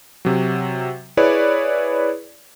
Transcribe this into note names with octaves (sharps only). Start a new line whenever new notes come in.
C3 F#3
E4 G#4 B4 C#5 D5